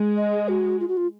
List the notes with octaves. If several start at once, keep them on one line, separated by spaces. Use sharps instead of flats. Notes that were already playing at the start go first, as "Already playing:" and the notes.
Already playing: G#3
D#5
F#4
F4
F#4
F4